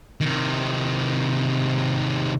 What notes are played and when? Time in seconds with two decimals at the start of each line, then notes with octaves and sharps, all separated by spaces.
0.21 C3 D#3